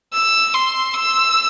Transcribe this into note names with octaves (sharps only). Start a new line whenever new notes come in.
E6
C6
E6